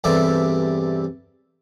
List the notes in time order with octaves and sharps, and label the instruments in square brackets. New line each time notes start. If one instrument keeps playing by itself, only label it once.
[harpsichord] E2 G2 C3 A4 D5 E5